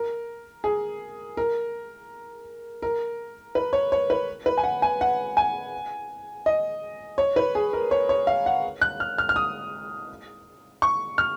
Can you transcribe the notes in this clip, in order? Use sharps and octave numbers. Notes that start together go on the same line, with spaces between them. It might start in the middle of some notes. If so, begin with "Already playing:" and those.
Already playing: A#4
G#4
A#4
A#4
B4
C#5
C#5
B4
B4
G#5
F#5
G#5
F#5
G#5
D#5
C#5
B4
G#4
A#4
C#5
C#5
F5
F#5
F#6
F6
F6
F6
D#6
C#6
F6